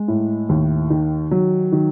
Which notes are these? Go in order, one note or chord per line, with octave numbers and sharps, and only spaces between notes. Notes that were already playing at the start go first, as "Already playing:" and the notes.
Already playing: G#3
A2
D#2
D#3
F#3
D#3